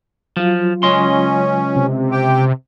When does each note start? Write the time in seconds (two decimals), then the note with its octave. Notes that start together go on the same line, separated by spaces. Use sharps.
0.37 F3 F#3 F4
0.83 C#2 C#4 D#5 C6
1.76 C3
2.12 G4 G5